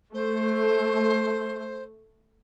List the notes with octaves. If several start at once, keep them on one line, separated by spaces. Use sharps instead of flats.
A3 C5